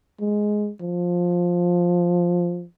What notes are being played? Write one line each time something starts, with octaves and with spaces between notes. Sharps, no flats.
G#3
F3